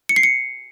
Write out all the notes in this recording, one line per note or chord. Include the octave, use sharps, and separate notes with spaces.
C#7
C7
C#7